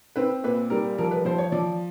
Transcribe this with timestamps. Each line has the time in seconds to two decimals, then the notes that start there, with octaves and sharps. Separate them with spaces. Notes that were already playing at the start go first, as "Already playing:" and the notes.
0.16 C4 B4
0.43 A#2 B4
0.70 G3 A#4
0.98 F3 A#4
1.11 B4
1.25 F3 C5
1.38 C#5
1.52 F3 D5